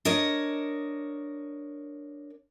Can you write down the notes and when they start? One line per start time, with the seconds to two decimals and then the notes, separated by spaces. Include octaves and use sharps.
0.05 D4 A#4 C#5 D#5